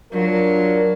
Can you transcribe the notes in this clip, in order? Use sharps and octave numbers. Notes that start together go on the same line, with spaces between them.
F#3 D4 F4 A#4